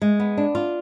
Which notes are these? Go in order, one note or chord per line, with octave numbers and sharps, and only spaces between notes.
G#3
B3
D4
F4